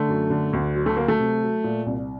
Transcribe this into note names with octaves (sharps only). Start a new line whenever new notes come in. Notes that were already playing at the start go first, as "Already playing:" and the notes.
Already playing: D3 A3
F#2
D3
D2
F#3
A3
F#3 A#3
A3
C3
F#3
A#2
C2